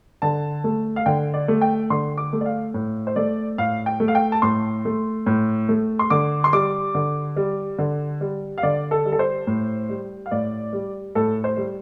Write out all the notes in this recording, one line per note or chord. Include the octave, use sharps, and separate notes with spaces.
D3 A5
A3
F5
D3 G5
D5
A3
G5
D3 C6
D6
A3
D5
F5
A2
C5
A3 D5
A2 F5
G5
A3
F5
G5
A5
A2 C6
A3
A2
A3
C6
D3 D6
C6
G3 D6
D3
G3
D3
G3
F5
D3 D5
A4
G3
A4
C5
A2
G3
F5
A2 D5
G3
A2 A4
C5
G3